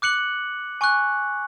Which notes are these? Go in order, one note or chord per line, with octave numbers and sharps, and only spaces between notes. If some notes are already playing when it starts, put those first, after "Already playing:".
D6 F#6 C#7 F#7
G#5 C#6 F#6